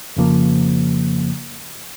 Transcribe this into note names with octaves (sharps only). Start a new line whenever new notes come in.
F2 C#3 F3 A#3